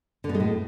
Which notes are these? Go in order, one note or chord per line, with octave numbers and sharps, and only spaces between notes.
D3
B2
G#3
A2